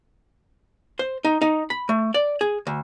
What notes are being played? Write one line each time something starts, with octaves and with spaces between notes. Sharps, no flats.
C5
D#4
D#4
B5
A3
D5
G#4
D2